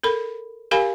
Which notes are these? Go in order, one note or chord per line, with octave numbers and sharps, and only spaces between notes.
A4 A#4 B5
G4 A#4 F5 G#5 B5